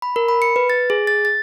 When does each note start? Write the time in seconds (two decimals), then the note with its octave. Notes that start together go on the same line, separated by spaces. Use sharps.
0.02 B5
0.16 A#4
0.28 B5
0.42 C#7
0.56 B4
0.70 A6
0.90 G#4
1.07 A6
1.25 A6